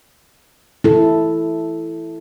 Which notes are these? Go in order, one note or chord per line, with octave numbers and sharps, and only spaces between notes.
E4 A4